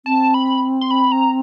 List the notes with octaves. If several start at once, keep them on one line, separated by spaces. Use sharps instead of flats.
C4 A5
B5
C6
B5
A#5